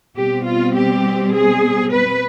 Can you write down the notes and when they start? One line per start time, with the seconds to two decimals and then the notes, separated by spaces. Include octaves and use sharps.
0.17 B2 G3 C4 G4
0.46 F4
0.76 G4
1.33 G#4
1.92 B4